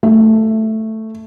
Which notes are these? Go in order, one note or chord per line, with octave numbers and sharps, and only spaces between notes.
A3